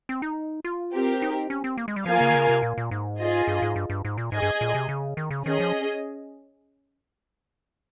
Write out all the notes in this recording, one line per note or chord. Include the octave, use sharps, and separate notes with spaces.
C4
D#4
F4
C4 G4 A#4
D#4
C#4
C4
A#3
G#3
G3
F3 A#3 F4 A#4 F5 G#5
C#3
D#3
C#3
C3
A#2
A#2
G#2
F4 G#4 D#5
G2
G#2
G2
G2
G#2
A#2
G#2 G#4 D#5 G#5
G2
A#2
C3
C#3
D#3
C#3
D#3 C#4 G#4 D#5
F3